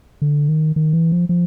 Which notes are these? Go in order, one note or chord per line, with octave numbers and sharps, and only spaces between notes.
D3
D#3
D#3
E3
F3
F3